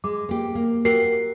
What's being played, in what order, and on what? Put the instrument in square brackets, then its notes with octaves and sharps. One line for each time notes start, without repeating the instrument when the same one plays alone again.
[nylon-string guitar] G#3 [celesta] D6
[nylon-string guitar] A#3 G4
A#3
[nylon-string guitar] F#4 G4 [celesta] A#4 C7